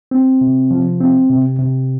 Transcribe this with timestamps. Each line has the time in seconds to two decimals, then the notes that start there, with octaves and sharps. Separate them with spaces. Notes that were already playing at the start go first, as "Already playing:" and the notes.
0.11 C4
0.41 C3
0.71 F3
1.00 C4
1.30 C3
1.59 C3